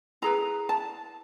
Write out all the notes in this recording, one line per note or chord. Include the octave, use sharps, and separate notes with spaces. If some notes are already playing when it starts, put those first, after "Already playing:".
E4 G#4 B4 A#5
A5